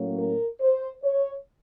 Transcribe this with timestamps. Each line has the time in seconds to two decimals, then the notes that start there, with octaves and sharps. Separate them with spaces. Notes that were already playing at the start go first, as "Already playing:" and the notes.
Already playing: A2 F#3 A#3 C#4
0.18 A#4
0.61 C5
1.04 C#5